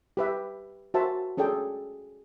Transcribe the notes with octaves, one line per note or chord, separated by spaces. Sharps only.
G4 B4 E5
F#4 A#4 C5 E5 A5
C#4 G#4 A4 D5 G5